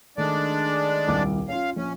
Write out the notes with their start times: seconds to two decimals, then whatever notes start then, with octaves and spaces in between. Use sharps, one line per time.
0.18 D#3 G#3 A3 D4 D5
1.08 D#1 C2 D6
1.49 C#4 F4 F5
1.76 A#1 C#4